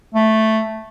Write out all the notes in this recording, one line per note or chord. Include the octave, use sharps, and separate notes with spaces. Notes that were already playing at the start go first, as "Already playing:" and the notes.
A3